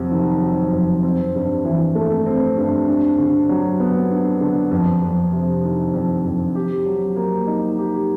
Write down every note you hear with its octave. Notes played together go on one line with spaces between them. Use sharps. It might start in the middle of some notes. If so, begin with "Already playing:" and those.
Already playing: F2 C3 F#3
D#3
F#3
F2
C4
G2
E3
A3
C4
G2
D4
D3
F#3
B3
D4
D3
F2
F2
C3
D#3
F2
F2
G4
F#3
A#3
D#4
G4